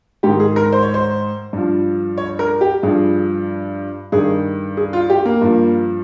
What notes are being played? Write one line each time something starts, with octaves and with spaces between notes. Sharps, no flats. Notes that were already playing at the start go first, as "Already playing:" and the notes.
G#2 D#3 G4
G#4
A#4
C5
C#5
C5
G2 F3
C#5
A#4
G4
G2 F3 G#4
G2 D#3 G#4
G#4
F4
G4
A#3
G2 F3